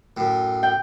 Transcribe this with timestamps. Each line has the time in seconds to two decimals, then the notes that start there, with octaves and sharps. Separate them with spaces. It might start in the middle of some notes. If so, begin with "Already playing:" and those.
0.17 F#2 A2
0.63 G5